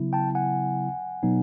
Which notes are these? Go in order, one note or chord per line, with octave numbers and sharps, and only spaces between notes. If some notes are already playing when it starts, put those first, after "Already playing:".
Already playing: C#3 F#3 B3 E4
G5 A5
F#5 G#5
B2 F#3 B3 D#4